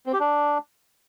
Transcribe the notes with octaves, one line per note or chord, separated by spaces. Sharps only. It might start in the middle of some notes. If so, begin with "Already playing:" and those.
C4
G4
D4